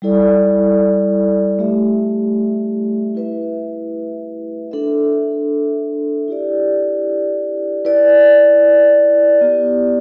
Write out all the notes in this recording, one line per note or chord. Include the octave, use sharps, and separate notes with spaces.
G3 E4 A4 D5
A3 G4 E5
E4 B4 E5
D4 A4 E5
E4 G4 D5
E4 B4 D5
B3 E4 G4 D5